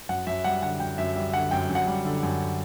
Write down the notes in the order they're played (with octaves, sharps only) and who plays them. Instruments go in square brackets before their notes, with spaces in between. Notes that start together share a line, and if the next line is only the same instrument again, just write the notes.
[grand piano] F#2 F#5
F#2 E5
G3 F#5
D3 F#5
F#2 G5
F#2 E5
G3 E5
D3 F#5
F#2 G5
F#2
F#5
G3
D3
F#2